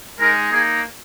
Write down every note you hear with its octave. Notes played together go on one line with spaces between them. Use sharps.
G#3 D#4 A#4
A#3 D#4 G#4